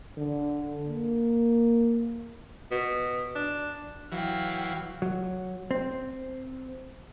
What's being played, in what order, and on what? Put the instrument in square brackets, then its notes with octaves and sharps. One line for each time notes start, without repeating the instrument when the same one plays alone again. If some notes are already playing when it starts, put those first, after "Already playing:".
[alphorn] D3
A#3
[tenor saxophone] B2
D4
[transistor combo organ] E3 F#3 [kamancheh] F5 G5
[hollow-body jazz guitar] F#3
C4